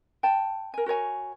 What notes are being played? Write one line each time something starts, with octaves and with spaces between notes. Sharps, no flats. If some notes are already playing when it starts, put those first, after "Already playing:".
G5 A5
A#4 G#5
F#4 A#4 C#5 G#5